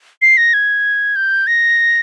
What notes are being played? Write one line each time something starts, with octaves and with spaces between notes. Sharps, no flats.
C7
A#6
G#6
G6
A#6